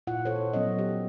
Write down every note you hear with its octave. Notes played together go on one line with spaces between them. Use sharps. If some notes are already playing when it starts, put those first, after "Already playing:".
A#2 E4 F4 F#5
A4 C5 C#5
F#3 B3 C#4 D#5
G4